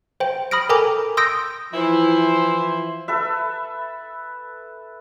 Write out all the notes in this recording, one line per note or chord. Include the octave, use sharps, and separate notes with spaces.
C5 G5
B5 D#6 F6 A#6 D7
A4 A#4 G5 G#5 A#5 D6
C6 D#6 E6 G6 A#6 D7
E3 F3 E4 C5
A4 B4 E5